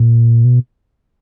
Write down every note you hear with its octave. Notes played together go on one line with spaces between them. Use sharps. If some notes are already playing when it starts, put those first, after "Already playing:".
Already playing: A#2
B2